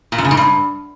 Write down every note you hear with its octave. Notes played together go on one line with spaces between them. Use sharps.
A#2
F#2
C#3
G#2
G2